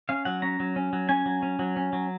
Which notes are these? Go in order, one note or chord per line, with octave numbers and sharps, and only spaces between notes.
C#4 F5
F#3 F#5
C#4 A#5
F#3
C#4
F#3
C#4 G#5
F#3
C#4
F#3
C#4
F#3